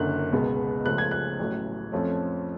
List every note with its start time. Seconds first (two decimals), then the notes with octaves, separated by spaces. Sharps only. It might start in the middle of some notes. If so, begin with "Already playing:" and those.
Already playing: F#1 F#2 D3 F#6
0.32 C#2 B2 G#3 B3
0.85 C#2 C#3 F3 A3 F#6
0.98 G#6
1.11 F#6
1.39 A1 A2 F#3 A3
1.92 F2 F3 A3 C#4